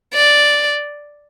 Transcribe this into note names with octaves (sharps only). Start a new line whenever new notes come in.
D5